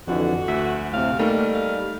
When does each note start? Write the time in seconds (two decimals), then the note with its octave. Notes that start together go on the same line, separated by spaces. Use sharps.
0.08 F2 D3 E3 F#4
0.48 D2 E5
0.93 A2 C3 F5
1.19 G3 A3 A#3 D#4
1.54 F5